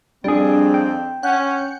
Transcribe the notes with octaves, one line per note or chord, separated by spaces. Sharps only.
F2 G3 C4 D4 G#4
G5
C#4 F#5 F#6 G6